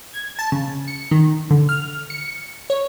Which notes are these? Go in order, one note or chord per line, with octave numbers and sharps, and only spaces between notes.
G#6
A5
C#3
C#7
D#3
D3
F6
C#7
C#5